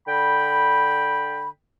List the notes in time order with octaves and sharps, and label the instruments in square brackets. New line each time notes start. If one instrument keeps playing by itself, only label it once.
[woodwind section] D3 G5 B5